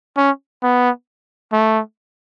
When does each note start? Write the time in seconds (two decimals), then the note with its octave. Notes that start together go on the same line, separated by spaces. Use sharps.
0.17 C#4
0.63 B3
1.53 A3